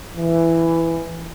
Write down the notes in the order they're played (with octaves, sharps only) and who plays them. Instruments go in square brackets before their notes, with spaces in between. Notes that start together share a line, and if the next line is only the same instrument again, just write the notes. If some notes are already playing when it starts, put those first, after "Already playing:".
[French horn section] E3